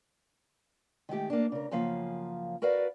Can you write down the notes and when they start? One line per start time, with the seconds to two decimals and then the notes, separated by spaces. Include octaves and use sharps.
1.09 D#3 G#3 A3 G4
1.30 A#3 D4
1.52 C#3 A#4
1.71 F#2 C#3 F3 A#3 F5
2.62 F#4 A#4 B4 D5 F5